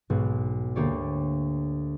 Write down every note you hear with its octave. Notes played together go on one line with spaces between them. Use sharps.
B1 G#2 B2 G#3 B3
D2 A#3 G4 C#5 D5